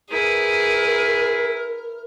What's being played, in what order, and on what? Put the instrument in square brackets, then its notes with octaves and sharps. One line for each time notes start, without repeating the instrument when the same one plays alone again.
[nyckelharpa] E4 B4 [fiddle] G#4 [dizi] A#4